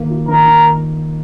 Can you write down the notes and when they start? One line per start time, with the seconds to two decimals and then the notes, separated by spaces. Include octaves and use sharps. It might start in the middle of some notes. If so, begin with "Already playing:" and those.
Already playing: D#3 A#3
0.10 F4
0.28 D#3 A#4
0.46 D#3